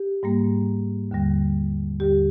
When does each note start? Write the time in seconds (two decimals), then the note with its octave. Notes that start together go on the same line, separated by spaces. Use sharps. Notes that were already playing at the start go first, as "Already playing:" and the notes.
Already playing: G4
0.23 G#2 G3 A#3
1.11 D#2 D3 G3
1.99 D#2 D3 G3 G4